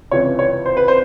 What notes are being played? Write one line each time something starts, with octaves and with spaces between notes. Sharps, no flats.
C#2 C3 E3 C#5
C#5
C5
B4
C5